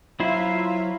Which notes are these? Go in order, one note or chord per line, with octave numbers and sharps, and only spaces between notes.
F#3 E4 F4 C5 E5